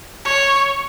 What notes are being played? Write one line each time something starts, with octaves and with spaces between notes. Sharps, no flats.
C#5